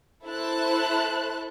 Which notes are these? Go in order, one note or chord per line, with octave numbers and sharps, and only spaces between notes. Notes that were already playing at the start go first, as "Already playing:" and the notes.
E4 A4 C5 E5 A5 F#6